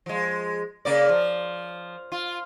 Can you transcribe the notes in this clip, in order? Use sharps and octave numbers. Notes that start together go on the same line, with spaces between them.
F3 G#3
C#3 A#3 D5
F3
F4